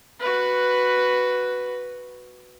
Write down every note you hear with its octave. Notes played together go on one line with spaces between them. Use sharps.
F#4 B4